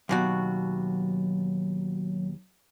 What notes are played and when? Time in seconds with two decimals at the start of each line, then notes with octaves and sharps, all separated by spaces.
0.09 D#2 B2 F#3 F#4